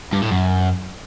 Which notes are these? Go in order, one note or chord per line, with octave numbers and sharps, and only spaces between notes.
G2
A2
F#2